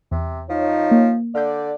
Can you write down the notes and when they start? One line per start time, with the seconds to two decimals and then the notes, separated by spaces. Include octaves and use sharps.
0.12 E2 C3
0.49 F3 D#4 C#5
0.91 A#3
1.35 D3 D5 F5 G6